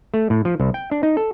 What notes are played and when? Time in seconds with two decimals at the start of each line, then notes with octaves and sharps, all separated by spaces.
0.14 A3
0.30 A2
0.45 F3
0.60 C2
0.74 G5
0.91 D4
1.03 D#4
1.17 A4